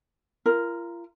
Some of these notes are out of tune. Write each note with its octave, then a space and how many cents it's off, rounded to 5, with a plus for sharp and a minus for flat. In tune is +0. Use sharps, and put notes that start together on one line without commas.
F4 -35 A#4 +0